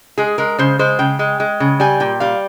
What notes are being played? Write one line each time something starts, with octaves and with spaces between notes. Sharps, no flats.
G#3 G#4
G#3 A#4
C#3 C5
G#3 C5
C#3 G5
G#3
G#3
C#3
G3 G#5
A#2 G5
G3 F5